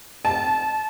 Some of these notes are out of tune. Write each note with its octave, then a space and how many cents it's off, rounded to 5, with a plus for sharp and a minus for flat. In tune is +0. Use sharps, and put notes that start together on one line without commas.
A5 -25